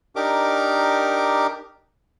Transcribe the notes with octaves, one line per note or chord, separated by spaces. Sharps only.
D4 D#4 G4 A#4 D6